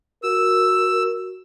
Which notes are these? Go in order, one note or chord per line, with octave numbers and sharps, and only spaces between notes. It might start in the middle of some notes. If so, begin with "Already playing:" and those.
F#4 A#4 E6